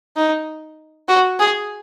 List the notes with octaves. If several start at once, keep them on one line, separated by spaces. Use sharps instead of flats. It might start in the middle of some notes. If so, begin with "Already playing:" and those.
D#4
F#4
G#4